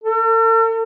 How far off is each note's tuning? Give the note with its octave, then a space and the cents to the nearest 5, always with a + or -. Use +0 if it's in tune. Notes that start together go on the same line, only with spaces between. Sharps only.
A4 +45